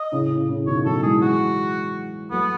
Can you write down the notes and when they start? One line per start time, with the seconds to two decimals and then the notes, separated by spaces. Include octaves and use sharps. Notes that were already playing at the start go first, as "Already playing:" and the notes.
Already playing: D#5
0.12 A2 C#3
0.31 A2
0.48 A2 C#3
0.67 B2 D#3 C#5
0.85 D#3 F#3 A4
1.03 E3 G#3 G#4
1.22 F#4
2.31 F#3 A3 B3